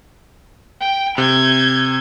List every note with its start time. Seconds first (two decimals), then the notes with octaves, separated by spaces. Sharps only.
0.80 G5
1.18 C3 G6 G#6